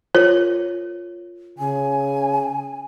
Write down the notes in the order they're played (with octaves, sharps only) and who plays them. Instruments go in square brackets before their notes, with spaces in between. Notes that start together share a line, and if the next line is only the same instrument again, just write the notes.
[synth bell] F4 A#4 [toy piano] C#5
[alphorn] C#3 [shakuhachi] G#5